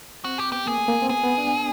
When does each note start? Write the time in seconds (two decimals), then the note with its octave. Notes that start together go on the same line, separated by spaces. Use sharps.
0.24 C4 F#4
0.38 G4
0.52 B3 G4
0.66 A#3 G#4
0.78 A3
0.88 A#3
1.02 C4
1.09 B3 G#4
1.23 B3
1.38 D4